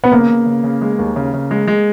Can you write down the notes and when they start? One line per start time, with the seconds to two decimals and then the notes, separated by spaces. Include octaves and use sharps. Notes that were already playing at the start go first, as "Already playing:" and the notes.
0.04 B3
0.12 C#3 A#3
0.29 C#3
0.46 C#3
0.64 C#3
0.81 G#3
0.99 D#2
1.16 C#3
1.34 C#3
1.51 G#3
1.68 G#3